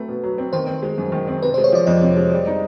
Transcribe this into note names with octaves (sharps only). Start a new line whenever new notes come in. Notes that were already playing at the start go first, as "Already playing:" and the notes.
Already playing: F#3 A3 C4 B4
B2
F#3
C4
D#3 C5
C4
G#3
F#2
D#3
C4
C3 B4
C5
G#3
C#5
F3 D5
F2 D#5
C3
G#3
G3
D#4